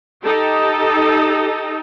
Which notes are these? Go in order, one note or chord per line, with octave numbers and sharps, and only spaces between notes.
D#4 G4 A4